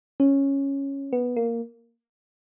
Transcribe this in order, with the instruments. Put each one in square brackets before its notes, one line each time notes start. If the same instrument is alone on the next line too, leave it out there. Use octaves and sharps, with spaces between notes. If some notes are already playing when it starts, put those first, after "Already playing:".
[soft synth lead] C#4
B3
A#3